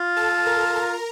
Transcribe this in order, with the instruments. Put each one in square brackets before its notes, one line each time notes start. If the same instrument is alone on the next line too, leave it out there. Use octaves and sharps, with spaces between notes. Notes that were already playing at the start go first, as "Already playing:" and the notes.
Already playing: [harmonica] F4
[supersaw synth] A4 A5
A#4 A#5
A#4 A#5